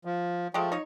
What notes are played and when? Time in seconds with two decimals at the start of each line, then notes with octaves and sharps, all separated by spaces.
0.05 F3
0.54 F3 G#3 A3 G4
0.72 D#4 C#5